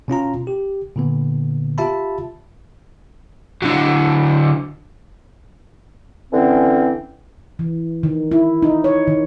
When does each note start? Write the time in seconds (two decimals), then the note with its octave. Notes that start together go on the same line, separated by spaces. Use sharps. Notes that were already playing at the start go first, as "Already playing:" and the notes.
0.08 B2 C#4 F4 A#5
0.47 G4
0.96 A#2 D3 B3
1.78 F4 G4 E5 A5 B5
3.62 D3 F#3
6.32 D3 E3 C4 C#4
7.59 E3
8.03 D#3
8.32 E4
8.62 D#4
8.84 C#5
9.07 D#3